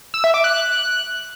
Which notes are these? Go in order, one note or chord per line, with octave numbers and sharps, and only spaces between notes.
E6
E5
D6
F#6